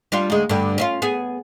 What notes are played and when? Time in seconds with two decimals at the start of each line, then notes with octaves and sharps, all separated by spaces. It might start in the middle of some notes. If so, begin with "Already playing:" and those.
0.12 G3 D4 F4
0.30 D2 G#3
0.49 G2 D3
0.78 C#4 E4 F4
1.02 B3 G#4